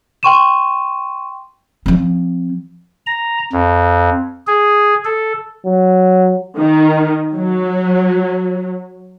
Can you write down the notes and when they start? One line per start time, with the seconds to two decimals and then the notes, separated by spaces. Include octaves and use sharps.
0.23 G5 C6 C#6 D#7 E7
1.86 F3 C4
3.07 A#5
3.53 F2
4.47 G#4
5.05 A4
5.65 F#3
6.57 D#3
7.36 F#3